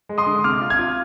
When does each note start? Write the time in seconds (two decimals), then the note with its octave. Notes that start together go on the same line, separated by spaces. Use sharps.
0.09 G#3
0.18 C6 D#6
0.26 D3
0.44 C3 D6 F6
0.61 F4
0.70 F6 G#6
0.79 F4